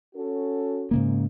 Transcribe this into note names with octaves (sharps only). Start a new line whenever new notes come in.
C#4 F#4 A4
G#2 C#3 A#3